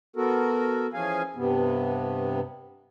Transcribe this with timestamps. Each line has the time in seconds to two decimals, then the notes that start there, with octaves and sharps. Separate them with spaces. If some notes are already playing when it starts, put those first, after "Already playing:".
0.16 B3 F#4 A4 A#4
0.94 E3 F3 C#4 G#4 F5 G#5
1.36 G2 C3 B3